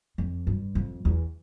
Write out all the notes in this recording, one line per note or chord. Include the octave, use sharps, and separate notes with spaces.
F2
G2
F2
E2